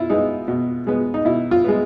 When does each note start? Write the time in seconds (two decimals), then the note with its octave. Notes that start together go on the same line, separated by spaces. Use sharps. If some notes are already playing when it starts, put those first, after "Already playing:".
Already playing: B2 E4 F4
0.10 G#3 B3 D#4
0.48 B2
0.87 G#3 B3
1.14 D#4
1.25 B2 E4
1.51 F4
1.64 G#3 B3